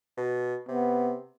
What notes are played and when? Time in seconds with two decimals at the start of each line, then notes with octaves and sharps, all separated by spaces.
0.18 B2
0.69 C3 B3